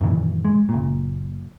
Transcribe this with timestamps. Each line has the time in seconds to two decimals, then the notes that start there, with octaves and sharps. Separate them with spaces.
0.01 F#2 A#2 D#3 E3
0.45 G#3
0.69 F#1 A#2